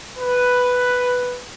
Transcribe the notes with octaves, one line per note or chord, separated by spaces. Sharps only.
B4